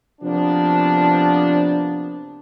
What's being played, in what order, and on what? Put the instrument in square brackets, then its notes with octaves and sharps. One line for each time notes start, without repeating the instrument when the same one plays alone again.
[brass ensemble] C3 F3 A#3 B3 D4